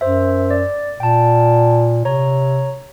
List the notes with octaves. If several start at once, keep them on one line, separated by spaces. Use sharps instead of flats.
F#2 C5 E5
D5
A#2 G5 A5
C3 C#5 A#5